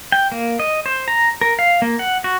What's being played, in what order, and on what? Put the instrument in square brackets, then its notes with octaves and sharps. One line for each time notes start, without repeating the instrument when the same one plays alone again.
[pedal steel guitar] G5
A#3
D#5
C5
A#5
A#4
F5
A#3
F#5
F#4